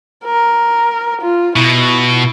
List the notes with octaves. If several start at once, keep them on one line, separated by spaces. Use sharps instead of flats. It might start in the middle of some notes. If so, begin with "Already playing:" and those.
A#4
F4
B2 E4